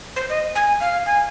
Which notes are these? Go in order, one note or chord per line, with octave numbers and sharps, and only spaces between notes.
C5
D#5
G#5
F5
G#5